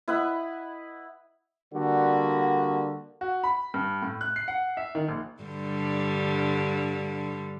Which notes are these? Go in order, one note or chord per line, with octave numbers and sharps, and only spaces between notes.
E4 B4 D#5 F#5
D3 G3 A#3 F#4
F#4
B5
G2
A2
F#6
C7
F#5
E5
D#3
A#1
G2 D3 G3